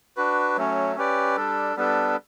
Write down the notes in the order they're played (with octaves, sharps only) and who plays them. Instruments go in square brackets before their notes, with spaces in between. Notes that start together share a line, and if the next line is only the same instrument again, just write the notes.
[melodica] D4 F#4 B4
F#3 A3 C#4
C#4 G4 B4 D5
G3 D4 A4
G3 B3 D4 A4